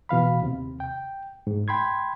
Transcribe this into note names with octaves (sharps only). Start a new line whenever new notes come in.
B2 E3 F5 B5
D#2 C3
G5
G#2
G5 B5 C6 G#6